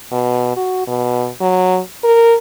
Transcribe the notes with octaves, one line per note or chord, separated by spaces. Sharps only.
B2
F#4
B2
F#3
A#4